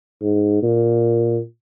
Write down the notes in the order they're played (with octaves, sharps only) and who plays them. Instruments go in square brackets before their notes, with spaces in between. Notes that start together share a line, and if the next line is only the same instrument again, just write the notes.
[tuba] G#2
A#2